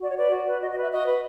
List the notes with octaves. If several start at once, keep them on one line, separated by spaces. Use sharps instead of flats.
F#4 D5
C#5
B4 D5
F#4
B4
F#4 D#5
D#5
B4 E5
F#4 D#5
B4